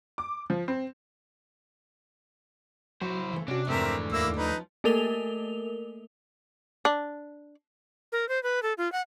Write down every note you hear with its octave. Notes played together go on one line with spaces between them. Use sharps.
D6
F3
C4
F#3 E4 F#4 C5
C#3 E3 A3
C3 C#4 D4 F#4
F2 G#2 E3 A3 C4 D4 A#4 E5
D#2 A#3 E4 E6
F3 C#4 D#4 B4
A3 A#3 A4 A#4 F7 G7
D4
A#4
C5
B4
A4
F4
F#5